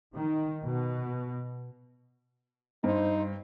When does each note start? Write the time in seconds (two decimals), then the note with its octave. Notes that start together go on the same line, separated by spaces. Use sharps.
0.14 D#3
0.62 B2
2.84 G2 D#4 C5